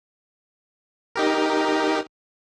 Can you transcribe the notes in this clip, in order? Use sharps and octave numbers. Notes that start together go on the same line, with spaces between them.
D#4 G4 A#4